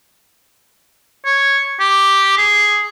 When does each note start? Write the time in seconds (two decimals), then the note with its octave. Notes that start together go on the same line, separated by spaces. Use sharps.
1.26 C#5
1.80 G4
2.38 G#4